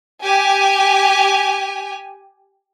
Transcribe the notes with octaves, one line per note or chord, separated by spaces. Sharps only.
G4 G#5